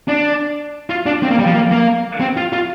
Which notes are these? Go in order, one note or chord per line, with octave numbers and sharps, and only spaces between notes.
D4
F4
D4
C4
A#3
G3
F3
A#3
A#3
C4
F4
F4